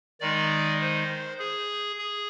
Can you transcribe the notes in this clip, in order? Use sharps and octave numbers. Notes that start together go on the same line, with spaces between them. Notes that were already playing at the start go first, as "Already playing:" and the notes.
D#3 G#3 D#4 D5
C5
G#4
G#4